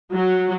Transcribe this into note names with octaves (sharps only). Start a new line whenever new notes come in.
F#3